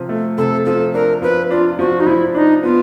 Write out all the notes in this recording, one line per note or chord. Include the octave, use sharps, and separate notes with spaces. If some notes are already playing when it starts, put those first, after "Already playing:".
Already playing: C3 F3
A3
C3 A4
F3 A4
D4 A#4
F3 B4
D4 F4
F3 F#4
D#4
F3 E4
D4 D#4
B3 F4